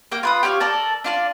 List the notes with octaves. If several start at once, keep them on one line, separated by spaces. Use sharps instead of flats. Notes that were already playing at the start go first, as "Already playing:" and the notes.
A#3 A#4 G5
F4 B4 D#6
G4 C#5 D#5 F5
A4 A#4 D5 A5
D4 F4 D5